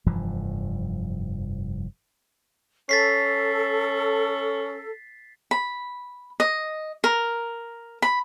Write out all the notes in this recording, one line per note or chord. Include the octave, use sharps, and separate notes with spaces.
F1 G2 E3 F3
C#4 A4 A6 B6 C7
B5
D#5
A#4
B5